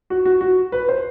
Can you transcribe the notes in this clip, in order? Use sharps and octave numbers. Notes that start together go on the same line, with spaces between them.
F#4
F#4
F#4
B4
C5